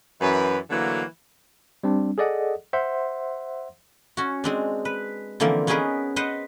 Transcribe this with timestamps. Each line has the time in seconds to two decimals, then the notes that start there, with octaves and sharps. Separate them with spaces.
0.21 F#2 E3 B4
0.70 D3 E3 F#3 A3 A#3
1.83 G3 C4 D4
2.18 G#4 A4 D5 D#5 F#5
2.73 C5 E5 F#5 C6
4.17 C#4 F#4
4.44 G#3 C4 D4
4.85 B4
5.40 D3 E3 F3 A#3 C4
5.67 B3 C#4 D#4 G#4 A#4 B4
6.16 B4 C5 D#5 F#5